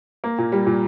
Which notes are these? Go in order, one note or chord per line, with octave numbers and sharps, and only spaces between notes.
A#3
A#2
G3
A#2